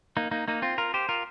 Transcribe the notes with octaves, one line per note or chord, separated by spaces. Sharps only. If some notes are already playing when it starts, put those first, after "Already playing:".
A#3 D#4
A#3 D#4
A#3 D#4
C4 F4
F4 A#4
G4 C5
F4 A#4